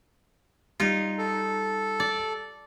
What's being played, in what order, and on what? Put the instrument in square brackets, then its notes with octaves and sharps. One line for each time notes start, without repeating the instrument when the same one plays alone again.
[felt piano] G3 [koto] D#4 F4
[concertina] A4
[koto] D5